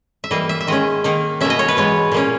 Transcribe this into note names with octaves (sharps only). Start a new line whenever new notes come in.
E5
E3 G3 A#3 D#5
E5
E5
D#3 G#3 C#4 D#5
D#3 A#3 D#4
B2 A#3 C#4 E5
D#5
C#5
B4
E3 G#3 B3 C#5
A#2 A#3 C#4